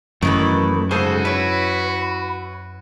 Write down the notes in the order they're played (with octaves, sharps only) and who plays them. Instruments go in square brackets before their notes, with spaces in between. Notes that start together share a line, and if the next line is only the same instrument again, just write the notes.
[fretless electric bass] F#2 [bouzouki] D#3 E3 B4 [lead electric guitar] A3
[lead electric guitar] G#2 C#3 [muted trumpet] F#4 [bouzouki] G#4 A4 C5
[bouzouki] E4 C#5 [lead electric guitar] B4